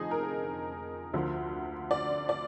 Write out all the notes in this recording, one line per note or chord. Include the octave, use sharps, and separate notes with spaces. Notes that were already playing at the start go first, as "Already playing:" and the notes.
Already playing: F1 F2 D3 F3 D#4 G#4
A#4
D2 D3 F3
D5
D5